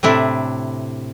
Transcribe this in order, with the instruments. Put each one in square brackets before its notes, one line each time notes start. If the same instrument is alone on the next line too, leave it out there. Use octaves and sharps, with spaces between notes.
[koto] A2 C3 D4 E4